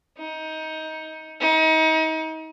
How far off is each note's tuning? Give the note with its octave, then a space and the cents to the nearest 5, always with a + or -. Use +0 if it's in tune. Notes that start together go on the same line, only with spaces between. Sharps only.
D#4 +20
D#4 +35